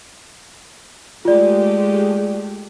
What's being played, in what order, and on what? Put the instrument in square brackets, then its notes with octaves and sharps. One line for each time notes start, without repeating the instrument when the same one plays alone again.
[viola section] G#3 A3 G4 [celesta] F4 D5